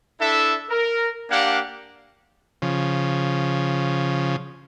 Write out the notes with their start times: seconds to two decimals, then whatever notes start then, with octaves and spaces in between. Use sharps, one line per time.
0.20 D4 E4 A4 E5
0.70 A#4
1.30 A#3 D4 G4 F5 F#5
2.62 C#3 F3